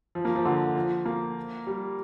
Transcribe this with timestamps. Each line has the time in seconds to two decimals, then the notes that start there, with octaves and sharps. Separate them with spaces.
0.15 F3
0.25 A#3
0.36 F3
0.45 D3
0.76 F3
1.06 A#3
1.67 G3